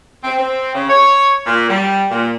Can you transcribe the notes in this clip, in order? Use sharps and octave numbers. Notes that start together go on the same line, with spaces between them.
C4
C4
C#3
C#5
A#2
G3
A#2